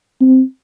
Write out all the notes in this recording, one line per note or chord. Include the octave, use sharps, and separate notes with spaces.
C4